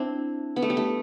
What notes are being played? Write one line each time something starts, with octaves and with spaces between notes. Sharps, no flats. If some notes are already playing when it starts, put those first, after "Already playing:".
Already playing: C4 D4 E4
B3
A3
G3
A3